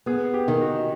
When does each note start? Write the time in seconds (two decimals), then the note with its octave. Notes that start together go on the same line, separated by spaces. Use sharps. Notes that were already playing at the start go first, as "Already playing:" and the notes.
0.06 B3 G#4
0.34 G4
0.48 D#3
0.62 F#4